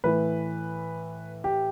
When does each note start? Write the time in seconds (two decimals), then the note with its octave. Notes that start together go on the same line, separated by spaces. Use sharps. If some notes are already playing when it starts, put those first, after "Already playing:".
0.04 A2 E3 B4
1.44 G4